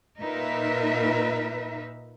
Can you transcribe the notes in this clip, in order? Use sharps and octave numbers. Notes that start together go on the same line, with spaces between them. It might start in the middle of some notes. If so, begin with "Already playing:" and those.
A#2 D#4 A#4 B4 E5